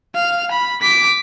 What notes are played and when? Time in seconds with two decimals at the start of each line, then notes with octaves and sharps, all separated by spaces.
0.15 F5
0.51 B5
0.82 D6 B6